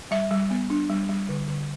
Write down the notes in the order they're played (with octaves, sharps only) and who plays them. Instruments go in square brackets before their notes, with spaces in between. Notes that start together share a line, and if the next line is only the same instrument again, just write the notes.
[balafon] G3 E5
G3
B3
D4
G3
G3
D3
D3